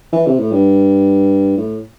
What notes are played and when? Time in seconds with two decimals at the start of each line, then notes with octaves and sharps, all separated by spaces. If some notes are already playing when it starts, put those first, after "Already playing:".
0.12 E3
0.26 C3
0.39 A2
0.52 G2
1.57 A2